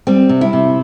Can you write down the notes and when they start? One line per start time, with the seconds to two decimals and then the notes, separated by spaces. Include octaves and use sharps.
0.07 G3 C4
0.29 C3
0.41 E4
0.53 C3